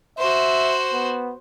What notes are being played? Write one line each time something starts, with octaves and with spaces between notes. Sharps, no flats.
F#4 C5 E5
B3